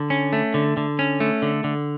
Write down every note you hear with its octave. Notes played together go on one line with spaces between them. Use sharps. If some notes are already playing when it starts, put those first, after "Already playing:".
Already playing: D3
C#4
A3
D3
D3
C#4
A3
D3
D3